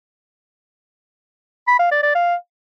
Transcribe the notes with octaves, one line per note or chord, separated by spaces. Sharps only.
B5
F5
D5
D5
F5